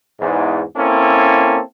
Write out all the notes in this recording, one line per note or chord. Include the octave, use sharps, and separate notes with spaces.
E2 G#2
A#3 C4 C#4 E4 A4